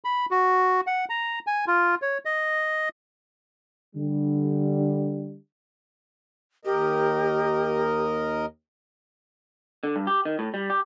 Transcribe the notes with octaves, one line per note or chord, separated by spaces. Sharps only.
B5
F#4
F#5
A#5
G#5
F4
C#5
D#5
D3 G3
D#2 G4 A#4 D#5
D3
G2
G4
D#3
A2
G3
G4